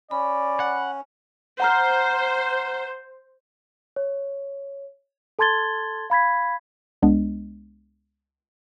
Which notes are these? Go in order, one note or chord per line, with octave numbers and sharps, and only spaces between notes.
C#4 D5 B5
F#5
C5 F#5 A#5 F6
C#5
A4 A5 C6 G#6 A6 G7
F5 B5 G#6 B6
C#2 G#3 B3 D4 D#5